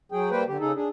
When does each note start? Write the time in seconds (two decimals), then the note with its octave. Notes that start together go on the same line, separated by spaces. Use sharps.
0.12 F#3 G#4 G5
0.31 G3 A#3 B4 C5 G5
0.48 D3 G4
0.60 C#3 D#4 G#4 A4
0.75 D4 G#4